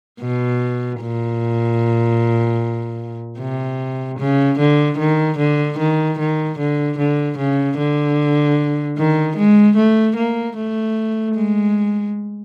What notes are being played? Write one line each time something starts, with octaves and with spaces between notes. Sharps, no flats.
B2
A#2
C3
C#3
D3
D#3
D3
D#3
D#3
D3
D3
C#3
D3
D#3
G#3
A3
A#3
A3
G#3